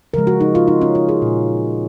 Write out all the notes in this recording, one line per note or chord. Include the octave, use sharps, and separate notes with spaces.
C#3 F3 G#3 A#4
F#4
D#4
F4
D#4
C#4
F4
G#4
A#2 G#3